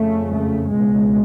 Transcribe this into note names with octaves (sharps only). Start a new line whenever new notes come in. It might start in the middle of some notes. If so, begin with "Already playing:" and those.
Already playing: F2 C#3 A3
A3
C#2 B2 G#3